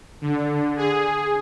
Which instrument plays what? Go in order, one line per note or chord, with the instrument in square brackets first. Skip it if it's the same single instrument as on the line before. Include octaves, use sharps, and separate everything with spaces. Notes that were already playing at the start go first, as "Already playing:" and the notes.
[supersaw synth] D3
G#4